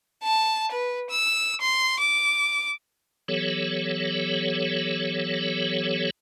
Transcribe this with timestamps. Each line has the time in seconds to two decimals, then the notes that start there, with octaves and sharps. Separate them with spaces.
0.23 A5
0.71 B4
1.10 E6
1.61 C6
1.99 D6
3.28 E3 F#3 B3 G4 A4 C#5